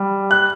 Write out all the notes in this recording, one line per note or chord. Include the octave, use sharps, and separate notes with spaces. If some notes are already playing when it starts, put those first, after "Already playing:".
Already playing: G3
F#6